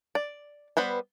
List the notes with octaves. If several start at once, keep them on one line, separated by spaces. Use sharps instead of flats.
D5
G3 B3 B4 C5